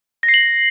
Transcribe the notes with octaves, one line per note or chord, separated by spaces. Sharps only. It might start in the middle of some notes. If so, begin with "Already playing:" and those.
A#6
C7
F#7